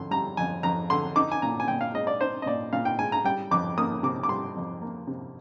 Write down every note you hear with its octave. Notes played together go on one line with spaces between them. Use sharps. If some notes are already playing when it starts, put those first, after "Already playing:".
Already playing: F2 D3 C6
G3 A#5
F2 G#5
F2 A#5
D3 C6
D#4 D6
G#5
A#2 A#5
G#5
A#2 G5
F5
G#3 D#5
D5
D#4 C5
D#5
A#2 D5
A#2 F5
G5
G#3 G#5
A#5
G3 G5
F2 D6
A#3 D#6
C3 D6
D6
G3 C6
F2
A#3
C3